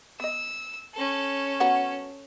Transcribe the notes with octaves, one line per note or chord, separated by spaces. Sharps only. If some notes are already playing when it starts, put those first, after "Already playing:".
B3 D#5 E6
C#4 A4
F#3 B3 F#4